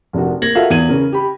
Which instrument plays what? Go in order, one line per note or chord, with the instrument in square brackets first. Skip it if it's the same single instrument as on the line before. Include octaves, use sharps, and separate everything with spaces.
[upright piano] F1 A#1 A#3 F#4
A#3 G#6 A#6 F#7
F4 F#4 A4 A#4 E5 F5
E2 G#6 D#7 F#7
C#3 C#4 A#4
G4 B5